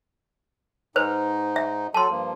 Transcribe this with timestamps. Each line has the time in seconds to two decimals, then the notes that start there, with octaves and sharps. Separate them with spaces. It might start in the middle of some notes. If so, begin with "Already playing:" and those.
0.96 G#2 D#4 B4 C5
1.56 E5
1.94 F#3 A4 A5 C6
2.11 G2 F3 A#3